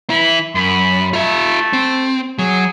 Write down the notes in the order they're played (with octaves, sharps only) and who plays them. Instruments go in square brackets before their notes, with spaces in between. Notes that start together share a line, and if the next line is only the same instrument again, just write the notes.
[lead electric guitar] E3 E4 [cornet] B5
[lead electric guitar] F#2 [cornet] B5
[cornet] A3 [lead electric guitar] F4 E5
[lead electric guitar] C4
[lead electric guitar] F#3 [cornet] G#4